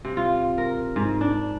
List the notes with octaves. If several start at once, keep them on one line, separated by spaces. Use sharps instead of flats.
C3
F4
A#4
G#2
D4